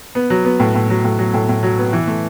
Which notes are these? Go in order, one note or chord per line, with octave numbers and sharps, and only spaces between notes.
B3
F#3
B3
A2
A2
F#3
A2
F#3
A2
A2
F#3
B3
E3
A3